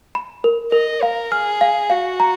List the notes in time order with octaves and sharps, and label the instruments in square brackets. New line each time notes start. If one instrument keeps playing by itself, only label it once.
[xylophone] B5
A#4
[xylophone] A#4 [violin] D#5
[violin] A#4 [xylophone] F5
[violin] G#4 [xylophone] F6
[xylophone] F5
[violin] F#4 [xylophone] F5
[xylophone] A#5